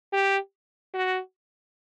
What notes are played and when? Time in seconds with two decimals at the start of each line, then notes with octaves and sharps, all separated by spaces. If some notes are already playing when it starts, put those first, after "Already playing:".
0.13 G4
0.94 F#4